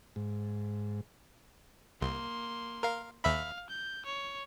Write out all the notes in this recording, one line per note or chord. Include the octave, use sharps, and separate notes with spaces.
G#2
C2 A#3 C6
A#4 F5
D#2 E5 F5 B5
G6
C#5